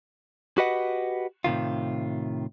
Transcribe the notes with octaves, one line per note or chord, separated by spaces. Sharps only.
F#4 G4 B4 D#5 F#5
A2 C3 D#3 F4